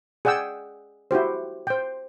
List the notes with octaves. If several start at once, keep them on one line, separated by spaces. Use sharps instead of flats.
G#4 D5 F#5 G5 E6
E4 F#4 G4 C5
C5 G5